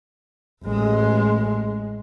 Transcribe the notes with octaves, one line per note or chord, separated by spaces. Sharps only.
A1 G#3